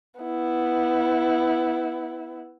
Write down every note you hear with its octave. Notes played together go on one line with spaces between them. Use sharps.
B3 E4